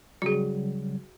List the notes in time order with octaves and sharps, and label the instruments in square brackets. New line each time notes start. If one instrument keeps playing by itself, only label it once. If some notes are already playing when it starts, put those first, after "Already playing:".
[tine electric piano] C#3 F#3 G3 [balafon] F#4 G#4